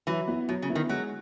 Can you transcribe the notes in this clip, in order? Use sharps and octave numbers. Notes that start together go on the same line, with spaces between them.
E3 F#3
B3 E4
B2 F#3
C#3
B3 E4
D#3
F#3 G#3